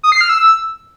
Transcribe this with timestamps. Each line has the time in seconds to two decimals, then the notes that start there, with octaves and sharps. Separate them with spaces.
0.03 D#6
0.12 C7
0.21 F6
0.29 E6